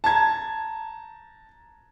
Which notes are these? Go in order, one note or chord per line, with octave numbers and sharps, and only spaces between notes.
A5 A#5 G#6